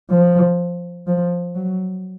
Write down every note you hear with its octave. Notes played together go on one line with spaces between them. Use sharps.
F3
F3
F#3